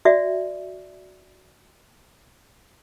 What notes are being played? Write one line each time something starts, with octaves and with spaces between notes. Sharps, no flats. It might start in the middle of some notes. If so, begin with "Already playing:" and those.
F#4 D5 E5